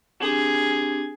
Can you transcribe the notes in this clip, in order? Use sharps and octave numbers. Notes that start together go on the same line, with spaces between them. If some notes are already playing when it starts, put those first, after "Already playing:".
C4 D4 G4 G#4 G#6